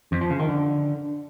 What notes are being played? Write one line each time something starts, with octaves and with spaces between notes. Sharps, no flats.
F2
F3
C#3
D#3
D3